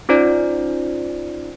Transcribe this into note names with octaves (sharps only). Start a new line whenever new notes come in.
C#4 D#4 F4 C5 D5